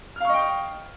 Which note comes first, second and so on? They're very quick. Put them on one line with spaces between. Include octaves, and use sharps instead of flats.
F6 F5 C#6 D#5 G5